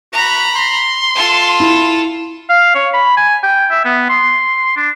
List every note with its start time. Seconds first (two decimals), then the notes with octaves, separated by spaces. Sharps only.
0.13 F#4 A#5 B5
0.56 C6
1.16 F4 A4
1.60 E4
2.49 F5
2.75 C#5
2.94 B5
3.17 G#5
3.43 G5
3.71 E5
3.85 B3
4.09 C6
4.76 D4